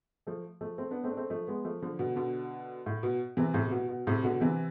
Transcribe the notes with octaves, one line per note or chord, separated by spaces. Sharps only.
F3 A3
F3 A3
A3 C4
B3 D4
A3 C4
D4
A3 C4
F3 A3
G#3 B3
F3 A3
D3 F3
B2 D3
B2 D3
A2
B2
C3 E3
A2 C3
C3
B2
B2
A2 C3
B2 D3
C3 E3